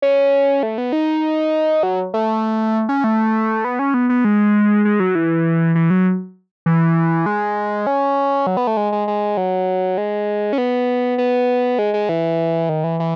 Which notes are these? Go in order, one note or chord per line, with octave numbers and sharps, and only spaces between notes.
C#4
A3
B3
D#4
F#3
A3
C#4
A3
B3
C#4
B3
B3
G#3
G#3
F#3
E3
E3
F#3
E3
G#3
C#4
F#3
B3
A3
G#3
G#3
G#3
F#3
G#3
C#4
B3
B3
G#3
G#3
E3
D#3
E3
E3